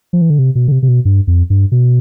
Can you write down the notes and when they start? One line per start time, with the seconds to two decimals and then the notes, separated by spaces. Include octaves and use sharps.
0.13 F3
0.21 E3
0.30 D3
0.39 C3
0.55 B2
0.68 D3
0.72 C3
0.83 C3
0.88 B2
1.05 G2
1.27 F2
1.50 G2
1.72 B2